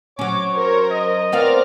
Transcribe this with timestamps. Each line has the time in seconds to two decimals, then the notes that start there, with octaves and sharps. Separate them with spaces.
0.19 F#3 C#4 C#5 D6
0.52 A#4 C5
0.91 D#5
1.32 B3 C4 F4 A#4 D5 F6